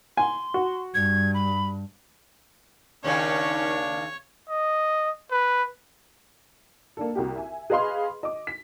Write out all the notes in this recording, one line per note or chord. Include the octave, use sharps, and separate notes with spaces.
G#5 C6
F#4
G2 G#6
B5
D#2 C#3 C#4 D4 C#5
D#5
B4
A#3 D4 A4
C2 F#4 G4
E5 G#5
G#4 B4 D#5 F5 B5 C6
D#5 D6
B6